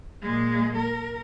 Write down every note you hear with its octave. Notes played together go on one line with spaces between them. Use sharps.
A#2 G#3
A#4